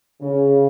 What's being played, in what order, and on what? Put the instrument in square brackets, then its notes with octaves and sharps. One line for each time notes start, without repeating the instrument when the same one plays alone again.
[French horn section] C#3